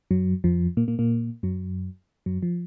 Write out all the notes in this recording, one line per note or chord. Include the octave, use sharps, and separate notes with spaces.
F#2 F#3
F2 F3
A#2 A#3
A#2 A#3
A#2 A#3
F#2 F#3
F#2 F#3
F3